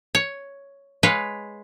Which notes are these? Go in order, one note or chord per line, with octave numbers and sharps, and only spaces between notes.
C#5
G#3 B4 C#5 F5